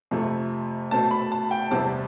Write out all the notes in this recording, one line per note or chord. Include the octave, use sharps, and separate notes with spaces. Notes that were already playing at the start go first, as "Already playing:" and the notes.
F2 C3 F3 A3
B2 A3 C4 A5
B5
A5
G5
E2 C3 E3 G3 C4 A5